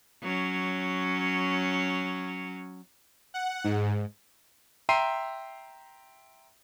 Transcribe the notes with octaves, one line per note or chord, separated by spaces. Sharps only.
F#3 C#4
F#5
G#2
E5 G5 A#5 C6 C7 D#7